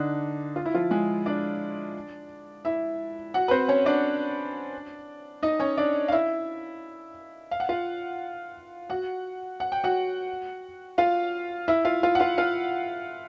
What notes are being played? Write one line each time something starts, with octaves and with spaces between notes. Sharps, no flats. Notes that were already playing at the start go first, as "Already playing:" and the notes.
Already playing: D3 D4 D#4
F4
E4
F3 F4
G#3 G#4
D4 D5
E4 E5
F#4 F#5
B4
C4 C5
C#4 C#5
D4 D5
D#4 D#5
C#4 C#5
D4 D5
F5
E4 E5
F5
F#5
F4 F5
F#4 F#5
F#5
G5
F#4 F#5
F4 F5
E4 E5
F4 F5
F4 F5
F#5
F4 F5
F4 F5